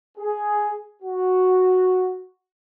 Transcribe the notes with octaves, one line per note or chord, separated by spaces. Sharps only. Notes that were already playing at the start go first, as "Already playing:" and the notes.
G#4
F#4